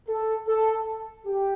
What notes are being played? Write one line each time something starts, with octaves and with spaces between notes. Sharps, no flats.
A4
A4
G4